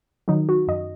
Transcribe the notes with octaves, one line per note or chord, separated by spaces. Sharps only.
D#3 F#3 D#4
F#4
F#2 D#5